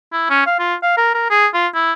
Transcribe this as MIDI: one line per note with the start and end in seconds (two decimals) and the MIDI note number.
0.13 0.29 64
0.30 0.42 61
0.46 0.55 77
0.59 0.75 65
0.83 0.95 77
0.97 1.10 70
1.14 1.26 70
1.30 1.47 68
1.54 1.68 65
1.74 1.93 64